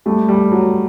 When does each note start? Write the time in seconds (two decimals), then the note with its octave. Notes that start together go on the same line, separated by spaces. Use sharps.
0.06 G3 A3
0.29 G3
0.52 F#3